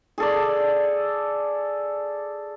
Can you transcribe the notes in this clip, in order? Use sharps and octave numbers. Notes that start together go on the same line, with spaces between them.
G#4 A4 D5